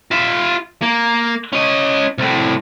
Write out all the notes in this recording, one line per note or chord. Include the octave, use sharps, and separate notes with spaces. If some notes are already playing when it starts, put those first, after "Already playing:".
F4 E5
A#3
C#4 D#5
C2 A2